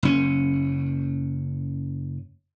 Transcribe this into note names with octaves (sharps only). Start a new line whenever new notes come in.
F#1 C#4